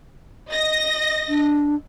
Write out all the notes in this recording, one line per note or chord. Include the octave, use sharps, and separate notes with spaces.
D#5 A#6
D4